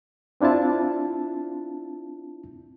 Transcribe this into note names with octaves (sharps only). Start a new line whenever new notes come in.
C4 D4 E4 F4 A5